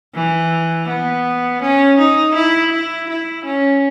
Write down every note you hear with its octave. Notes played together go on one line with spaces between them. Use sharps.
E3
B3
C#4
D#4
E4
E4
E4
C#4